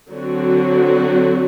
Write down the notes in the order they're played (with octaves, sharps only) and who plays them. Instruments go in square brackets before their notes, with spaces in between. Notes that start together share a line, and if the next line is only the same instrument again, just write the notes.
[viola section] D3 F#3 C4 F#4